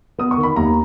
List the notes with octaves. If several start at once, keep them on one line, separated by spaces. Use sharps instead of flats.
B3 D#6
C#6
D#3
B5
D#2 A#5